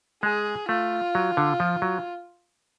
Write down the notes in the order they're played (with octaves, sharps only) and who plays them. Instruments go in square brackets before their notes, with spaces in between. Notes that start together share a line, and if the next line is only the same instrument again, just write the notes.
[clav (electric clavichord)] G#3 [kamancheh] G#4
[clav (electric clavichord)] A3 [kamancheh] F4
[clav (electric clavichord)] F#3
D3
F3
F#3